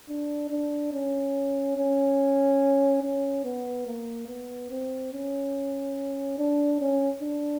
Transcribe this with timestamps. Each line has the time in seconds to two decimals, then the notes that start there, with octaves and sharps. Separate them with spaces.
0.09 D4
0.50 D4
0.92 C#4
1.77 C#4
3.02 C#4
3.44 B3
3.87 A#3
4.28 B3
4.70 C4
5.12 C#4
6.38 D4
6.81 C#4
7.22 D4